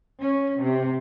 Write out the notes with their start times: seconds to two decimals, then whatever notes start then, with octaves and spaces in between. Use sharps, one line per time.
0.20 C#4
0.60 C3